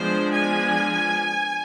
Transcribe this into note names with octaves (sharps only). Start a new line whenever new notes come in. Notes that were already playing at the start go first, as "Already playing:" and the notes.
Already playing: F3 G#3 B3 D4 C5
G#5